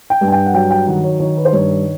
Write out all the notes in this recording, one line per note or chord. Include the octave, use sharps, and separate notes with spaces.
G5
G2
G#5
G5
F#5
F#3 G5
G5
D#3 F#5
C#5
D#3 C#5
B4
C5
G2 C#5